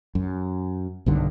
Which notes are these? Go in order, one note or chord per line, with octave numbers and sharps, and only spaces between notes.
F#2
B1 G2 D3 D#3